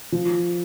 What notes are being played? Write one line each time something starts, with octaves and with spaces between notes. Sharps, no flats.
F3